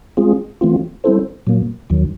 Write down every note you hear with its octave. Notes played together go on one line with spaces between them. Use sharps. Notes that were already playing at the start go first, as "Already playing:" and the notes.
G#3 C4 F4 G#4
E3 A3 C4 F4
G3 C4 E4 A4 C5
A#2 F#3 A#3
D#2 D#3 F#3